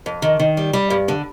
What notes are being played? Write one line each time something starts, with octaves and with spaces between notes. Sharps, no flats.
F2
D#3
D#3
G3
G3
G2
D3